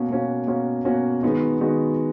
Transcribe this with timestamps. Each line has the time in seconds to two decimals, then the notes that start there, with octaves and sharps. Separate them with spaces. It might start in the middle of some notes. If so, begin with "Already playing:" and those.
Already playing: B2 A#3 C#4 F#4
0.10 B2 A#3 C#4 F#4
0.47 B2 A#3 C#4 F#4
0.85 B2 A#3 C#4 F#4
1.23 D#3 G#3 B3 D#4 F#4
1.61 D#3 G#3 B3 D#4 F#4